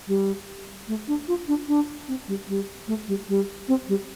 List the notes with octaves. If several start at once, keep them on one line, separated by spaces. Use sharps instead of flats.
G3
A3
D4
F4
D4
D4
C4
G3
G3
A3
G3
G3
C4
G3